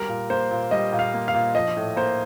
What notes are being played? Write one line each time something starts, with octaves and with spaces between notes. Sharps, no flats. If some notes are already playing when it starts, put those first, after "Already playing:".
Already playing: G3 A#4
A#2
A#3 C5
A#2
G3 D#5
A#2
F5
A#3
F5
A#2
F3 D#5
A2
A#3 C5